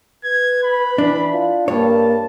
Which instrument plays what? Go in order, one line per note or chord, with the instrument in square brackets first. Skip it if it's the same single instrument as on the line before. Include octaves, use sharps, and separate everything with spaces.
[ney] B4 [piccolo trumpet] G#6
[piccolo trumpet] B5
[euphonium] E3 [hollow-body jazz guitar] D4
[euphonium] F4
[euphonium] G2 [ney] A#3 [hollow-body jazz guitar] C#5 [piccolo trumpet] A5